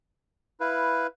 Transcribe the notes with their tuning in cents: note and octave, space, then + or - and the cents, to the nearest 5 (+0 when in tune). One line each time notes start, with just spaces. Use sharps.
E4 +0 B4 +0 F5 +0